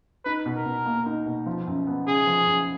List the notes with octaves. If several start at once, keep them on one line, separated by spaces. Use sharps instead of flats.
D#4 B4
B2
A#4
B2
A#3
D#4
B2
F3
F#2
B3
C#3 G#4
F3
F#2